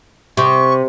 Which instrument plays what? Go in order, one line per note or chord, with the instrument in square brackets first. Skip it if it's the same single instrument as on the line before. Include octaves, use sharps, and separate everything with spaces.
[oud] C3 [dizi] C#6